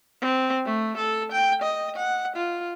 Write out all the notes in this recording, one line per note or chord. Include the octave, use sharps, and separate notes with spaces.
C4
A3
A4
G5
D#5
F#5
F4